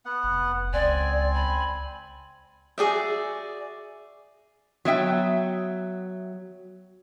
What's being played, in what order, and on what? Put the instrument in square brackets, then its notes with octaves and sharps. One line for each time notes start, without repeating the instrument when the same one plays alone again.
[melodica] B3 F#5
[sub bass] F1
[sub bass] C#2 [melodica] C4 G#5 [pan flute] D5
[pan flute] B5
[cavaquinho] F#4 G#4 D5 E5
[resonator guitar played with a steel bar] F#3 B3 E5 G5